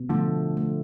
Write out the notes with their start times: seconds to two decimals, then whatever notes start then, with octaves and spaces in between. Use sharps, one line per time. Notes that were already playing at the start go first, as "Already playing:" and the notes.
Already playing: B2
0.09 D3 F3 A3
0.57 A3